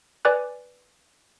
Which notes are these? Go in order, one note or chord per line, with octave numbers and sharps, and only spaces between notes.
B4 D5 G#5 D6 F#6